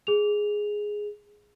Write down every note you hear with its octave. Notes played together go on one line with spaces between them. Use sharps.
G#4 F7